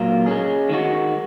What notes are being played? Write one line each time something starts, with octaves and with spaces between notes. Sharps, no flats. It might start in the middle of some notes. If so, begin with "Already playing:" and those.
Already playing: A#2 F#3 F4 A#4
G#3 C#4 G#4
D#3 G#3 D#4 F#4